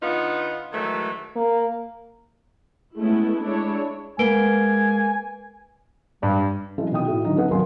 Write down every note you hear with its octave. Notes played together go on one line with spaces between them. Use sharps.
D3 B3 D#4 F4
D#3 E3 F#3 G#3 A3
A#3
G#3 A3 B3 C#4 E4
G#3 D4 E4 C#5
G#3 A#3 B3 B4 C5 G#5 D7 G7
G2 G3
E3 F#3 G#3 C#4 A4
B2 D#3 G5 D#6
A2 A3 F#4
D3 D#3 F#3 D#4
B3 C#4 A4 F#5
D#1 B1 F#3 A#3 G#5 C6